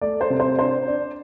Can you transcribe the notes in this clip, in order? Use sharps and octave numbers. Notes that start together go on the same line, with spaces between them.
A3 D5
C5
C3
C5
D4 C5
D4